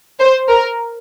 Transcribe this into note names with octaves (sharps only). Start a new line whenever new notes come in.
C5
A#4